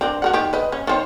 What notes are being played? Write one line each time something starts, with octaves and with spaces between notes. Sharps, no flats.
C4 D4 A#4
F#4 A#4 F#5
D#3 G4
B4 D#5
C#4
D#3 C4 C#5